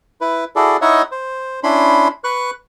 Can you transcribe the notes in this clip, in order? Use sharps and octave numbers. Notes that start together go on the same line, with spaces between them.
E4 B4
E4 F#4 G#4 A4 D5
D#4 E4 C#5 D#5 E5 F#5
C5
C#4 D4 E4 B5 C6
B4 C#6 F#6